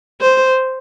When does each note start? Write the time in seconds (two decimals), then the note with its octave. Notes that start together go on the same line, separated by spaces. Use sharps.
0.21 C5